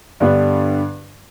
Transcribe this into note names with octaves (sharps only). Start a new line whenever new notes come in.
G2 D3 G3 B3 D4